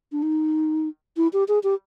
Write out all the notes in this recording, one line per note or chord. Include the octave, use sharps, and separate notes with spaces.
D4
D#4
E4
G4
G#4
G4